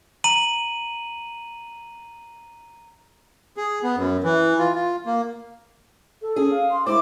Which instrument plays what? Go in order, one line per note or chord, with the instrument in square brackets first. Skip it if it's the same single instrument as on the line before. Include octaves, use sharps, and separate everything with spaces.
[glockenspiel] A#5 D#7 F#7
[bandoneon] G#4
B3
F#2
E3
F4
F4
A#3
[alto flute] A4
[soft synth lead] C#4 [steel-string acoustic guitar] G#4
[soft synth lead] F5
[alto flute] C6
[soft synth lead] G#3 [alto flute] E4 [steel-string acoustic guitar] C5 [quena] D6